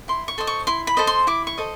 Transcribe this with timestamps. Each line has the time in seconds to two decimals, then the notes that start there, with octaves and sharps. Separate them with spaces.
0.08 E4 C6
0.28 C#6
0.38 A4 C5 D#5
0.47 C#6
0.67 E4 C6
0.87 B5
0.97 A4 C5 D#5
1.07 C6
1.27 E4 D6
1.47 C#6
1.57 A4 C5 D#5